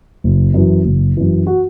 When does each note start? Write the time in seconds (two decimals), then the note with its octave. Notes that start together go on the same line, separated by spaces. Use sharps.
0.24 F#1
0.54 F#2 E3
0.85 F#1
1.17 F#2 E3
1.47 F#4